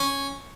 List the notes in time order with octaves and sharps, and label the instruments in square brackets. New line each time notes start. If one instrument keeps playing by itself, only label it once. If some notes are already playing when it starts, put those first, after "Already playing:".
Already playing: [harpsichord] C#4